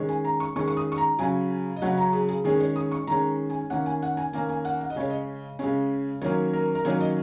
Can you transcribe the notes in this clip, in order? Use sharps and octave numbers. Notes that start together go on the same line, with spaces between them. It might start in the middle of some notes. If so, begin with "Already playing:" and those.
Already playing: D#3 G#3 C#4
G#5
A#5
C#6
D#3 G#3 C#4 C#6
C#6
D#6
C#6
A#5
C#3 F#3 C#4 G#5
D#5
C#3 F#3 C#4 F#5
A#5
G#4
G#4
D#3 G#3 C#4 G#4
C#5
D#6
C#6
D#3 G#3 C#4 A#5
G#5
D#3 A#3 C#4 F#5
G#5
F#5
G#5
D#3 A#3 C#4 G#5
G#5
F#5
F#5
D#5
C#3 G#3 C#4 C#5
D#5
C#3 G#3 C#4
D#3 F#3 A#3 C#4 C#5
A#4
A#4
D#3 F#3 A#3 C#4 C#5
D#5